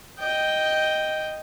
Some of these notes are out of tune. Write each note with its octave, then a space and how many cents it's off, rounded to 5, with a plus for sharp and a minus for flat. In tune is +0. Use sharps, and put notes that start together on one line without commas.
D#5 +0 G5 +0